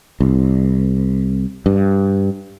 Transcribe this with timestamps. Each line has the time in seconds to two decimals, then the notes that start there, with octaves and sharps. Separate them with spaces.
0.20 C2
1.66 G2